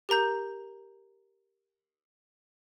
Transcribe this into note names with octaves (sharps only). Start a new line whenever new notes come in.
G4 A#4 A#5 G6